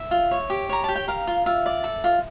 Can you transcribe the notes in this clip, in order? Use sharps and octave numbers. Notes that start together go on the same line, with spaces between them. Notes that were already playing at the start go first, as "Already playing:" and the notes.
Already playing: E5
F4
C#5
G4
C#5 A#5
G4 A5
G5
A#4 F5
F4
F4 E5
D5
A4
F4